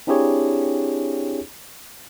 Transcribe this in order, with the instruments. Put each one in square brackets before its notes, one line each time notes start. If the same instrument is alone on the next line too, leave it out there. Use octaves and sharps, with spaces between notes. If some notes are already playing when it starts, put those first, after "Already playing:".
[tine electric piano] C4 D4 E4 G4 G#4 C#5